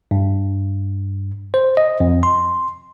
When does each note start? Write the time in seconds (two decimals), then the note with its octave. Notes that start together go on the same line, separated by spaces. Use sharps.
0.11 G2
1.54 C5
1.77 D#5
2.00 F2
2.23 C6